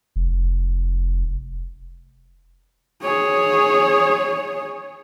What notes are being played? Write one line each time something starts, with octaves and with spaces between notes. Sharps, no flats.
F1
G#4 C#5